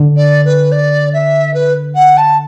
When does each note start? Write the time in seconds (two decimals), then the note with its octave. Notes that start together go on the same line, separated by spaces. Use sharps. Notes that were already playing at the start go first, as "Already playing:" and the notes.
Already playing: D3
0.16 D5
0.45 B4
0.72 D5
1.13 E5
1.54 B4
1.95 F#5
2.17 A5